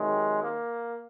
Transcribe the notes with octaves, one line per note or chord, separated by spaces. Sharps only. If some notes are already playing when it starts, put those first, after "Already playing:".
Already playing: C3 D#3 F#3 G#3
A#3